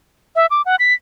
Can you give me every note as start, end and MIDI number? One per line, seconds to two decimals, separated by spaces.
0.36 0.46 76
0.51 0.62 86
0.66 0.76 78
0.79 0.93 95